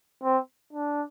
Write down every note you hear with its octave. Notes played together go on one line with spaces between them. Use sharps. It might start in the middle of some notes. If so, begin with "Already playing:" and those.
C4
D4